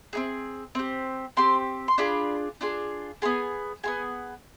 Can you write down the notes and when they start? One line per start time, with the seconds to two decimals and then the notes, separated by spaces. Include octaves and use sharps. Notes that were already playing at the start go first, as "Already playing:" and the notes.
0.13 C4 D#4 G#4
0.75 C4 G4
1.37 C4 G4 C6
1.88 C6
1.98 D4 F4 G#4 B5
2.61 D4 F4 G#4
3.22 B3 F4 G#4 G#5
3.83 B3 F4 G#4 G#5